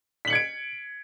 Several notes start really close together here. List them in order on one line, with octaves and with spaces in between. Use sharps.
B6 F#7 C#7 G#6 D7